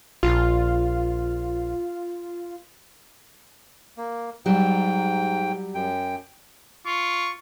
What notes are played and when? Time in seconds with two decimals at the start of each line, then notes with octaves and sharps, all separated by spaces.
0.23 A#1 F4
3.97 A#3
4.46 G#2 F#3 G3 G4 G5
5.75 F#2 G5
6.86 F4 C#6